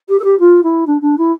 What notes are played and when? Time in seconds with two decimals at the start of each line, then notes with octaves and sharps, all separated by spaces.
0.08 G4
0.19 A4
0.24 G4
0.39 F4
0.63 E4
0.86 D4
1.01 D4
1.17 E4